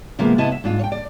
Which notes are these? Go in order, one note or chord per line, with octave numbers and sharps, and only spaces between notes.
C3 F3 G#3 A#3 B3
C3 B3 E4 D#5 A5
E5
G#2 D4 F4
C#5 G5
D5